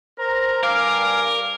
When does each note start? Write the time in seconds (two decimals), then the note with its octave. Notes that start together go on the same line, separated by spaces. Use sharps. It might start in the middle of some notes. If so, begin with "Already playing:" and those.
0.19 A#4 C5 A#5
0.63 G2 A#4 F5 G#5 D6